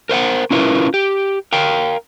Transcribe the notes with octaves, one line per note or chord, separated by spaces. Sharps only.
A#4 C5 F5 F#5
C#4 E4 F4 A#4 B4
G4
A#4 F5 G5